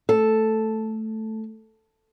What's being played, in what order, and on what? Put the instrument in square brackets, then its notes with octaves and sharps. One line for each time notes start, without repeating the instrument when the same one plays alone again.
[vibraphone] A3 [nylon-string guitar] A4